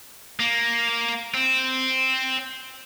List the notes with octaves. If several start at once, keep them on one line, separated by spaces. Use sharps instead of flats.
A#3
C4